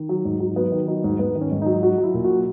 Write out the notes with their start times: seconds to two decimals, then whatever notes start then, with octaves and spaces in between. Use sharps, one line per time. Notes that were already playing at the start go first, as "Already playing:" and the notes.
Already playing: D#3
0.09 F#3
0.25 G#2
0.40 F#3
0.56 F#3 B3
0.72 D#3
0.87 F#3 D#4
1.04 G#2
1.19 G#2 B3
1.35 D#3
1.41 C#4
1.51 G#2
1.62 F#3 D#4
1.83 F#3 F#4
1.98 F#3
2.03 E4
2.14 A#2
2.24 F#4
2.30 F#3